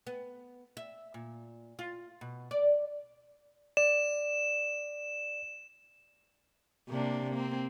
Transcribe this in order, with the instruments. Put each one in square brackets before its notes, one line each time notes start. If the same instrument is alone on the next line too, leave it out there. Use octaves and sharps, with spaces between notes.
[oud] B3
E5
A#2
F4
B2
D5
[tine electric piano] D5 [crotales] E7
[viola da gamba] C3 A#3 D4
A#3 C4